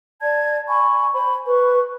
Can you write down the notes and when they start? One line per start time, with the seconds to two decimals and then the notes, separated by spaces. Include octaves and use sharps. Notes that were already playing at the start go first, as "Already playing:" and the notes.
0.21 D5 A5 G#6
0.68 G#5 B5 C#6
1.12 C5 B5
1.46 B4 C#6